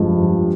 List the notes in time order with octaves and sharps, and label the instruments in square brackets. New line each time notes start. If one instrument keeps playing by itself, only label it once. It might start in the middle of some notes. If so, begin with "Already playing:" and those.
Already playing: [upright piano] G2 F3 G#3